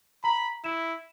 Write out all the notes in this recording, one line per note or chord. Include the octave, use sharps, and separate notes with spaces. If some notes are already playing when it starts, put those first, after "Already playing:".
A#5 B5
E4 E7